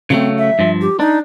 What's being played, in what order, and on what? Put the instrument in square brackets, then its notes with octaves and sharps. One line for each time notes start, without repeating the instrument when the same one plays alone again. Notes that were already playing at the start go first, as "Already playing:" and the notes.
[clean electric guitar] C#3 F#3 A3 [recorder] C4
[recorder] E5
[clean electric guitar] G2 F3
[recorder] G4
[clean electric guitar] D4 [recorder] D#4